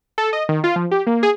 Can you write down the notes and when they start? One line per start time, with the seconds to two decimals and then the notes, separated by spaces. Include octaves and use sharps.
0.18 A4
0.33 D#5
0.49 D#3
0.64 F4
0.76 F3
0.91 G4
1.07 A#3
1.23 G#4